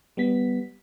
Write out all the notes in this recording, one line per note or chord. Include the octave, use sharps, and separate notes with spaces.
G3 B3 B6